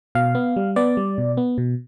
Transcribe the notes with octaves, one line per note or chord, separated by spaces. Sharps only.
B2 F5
B3
G3
B3 D5
G3
B2
B3
B2